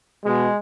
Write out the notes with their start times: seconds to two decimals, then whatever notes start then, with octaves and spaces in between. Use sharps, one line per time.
0.25 B2 G#3